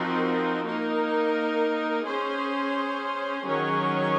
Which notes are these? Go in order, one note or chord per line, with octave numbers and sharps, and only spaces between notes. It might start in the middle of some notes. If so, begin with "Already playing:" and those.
Already playing: F3 C4 D#4 F#4 A#4
A#3 D#4 A#4
C#4 G#4 C5
D#3 F#3 C#4 G#4 C#5